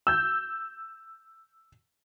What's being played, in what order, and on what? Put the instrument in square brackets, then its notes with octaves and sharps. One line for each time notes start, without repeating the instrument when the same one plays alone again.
[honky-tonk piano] E6 G6